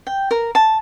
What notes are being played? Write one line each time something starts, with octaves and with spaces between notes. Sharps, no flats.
G5
A#4
A5